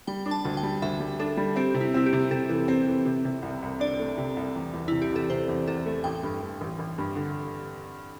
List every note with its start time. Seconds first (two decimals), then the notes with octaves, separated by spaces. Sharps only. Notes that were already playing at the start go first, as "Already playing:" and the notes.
0.07 G3 G5
0.26 D4
0.31 A5
0.45 D2
0.57 G5
0.63 G3
0.82 D2 E5
1.00 G3
1.19 D4 A4
1.37 G3
1.56 C4 G4
1.74 C3
1.81 E4
1.94 C4 E4
2.06 G4
2.13 C3
2.31 C3 A4
2.50 E3
2.68 C4
2.87 E3
3.05 C3
3.25 C3
3.42 C2
3.62 C2
3.80 D4 D5
4.00 A3
4.18 C3
4.37 C2
4.56 E2
4.74 E2
4.88 C3 E4
5.02 G4
5.12 E2 A4
5.30 C3 C5
5.48 E2
5.67 E2 A4
5.86 A3
6.04 A1 G5
6.23 G2
6.42 G2
6.61 A1
6.79 A1
6.98 G2
7.16 D3